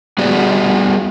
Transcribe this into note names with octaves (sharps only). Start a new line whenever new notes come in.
G3 B3 F#4 G#4 D5